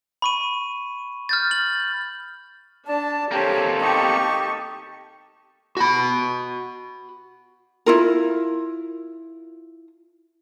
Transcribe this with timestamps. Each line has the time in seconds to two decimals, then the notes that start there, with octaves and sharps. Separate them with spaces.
0.22 B5 C#6 D#7
1.29 F6 G6 A6
1.51 F#7
2.87 D4 D5 A5
3.31 C3 A#3 G4 A4 C#5
3.80 D#4 G4 A5 C#6
5.77 F#4 B5
7.86 E4 F4 A#4